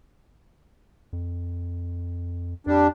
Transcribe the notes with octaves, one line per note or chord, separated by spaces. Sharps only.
F2
F2 G3 D4